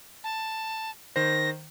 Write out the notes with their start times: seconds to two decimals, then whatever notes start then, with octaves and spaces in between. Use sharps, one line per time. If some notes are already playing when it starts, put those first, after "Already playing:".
0.24 A5
1.16 D#3 C5 A#6